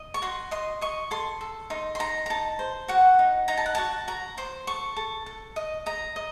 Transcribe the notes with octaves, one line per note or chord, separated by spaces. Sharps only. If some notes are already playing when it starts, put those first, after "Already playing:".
Already playing: D#5
C#6
F#4 C6
D#5 C6
D#5 C#6
A4 C6
A4
D#4 C6
C6
D#4 A#5
A#5
D#4 A5
C5
F#4 F#5
D#4
D#4 A#5
A5
F#5
F#4 A5
F#4 A#5
C5 C6
A4 C#6
A4
A4
D#5
D#5 A#5
D#5